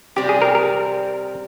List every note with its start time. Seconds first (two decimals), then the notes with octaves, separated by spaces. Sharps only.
0.16 C3 G3 C4 G4
0.29 G#4
0.42 A#4
0.55 A#4